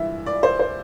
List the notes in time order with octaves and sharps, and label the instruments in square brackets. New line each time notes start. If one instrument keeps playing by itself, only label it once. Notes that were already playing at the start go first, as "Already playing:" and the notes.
Already playing: [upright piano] G2 E3 E5
D5
C5
C5